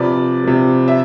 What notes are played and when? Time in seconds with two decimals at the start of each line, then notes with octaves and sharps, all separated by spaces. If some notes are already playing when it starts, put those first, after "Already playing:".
Already playing: C3 F3 B4 D5
0.44 C3 F3
0.88 E5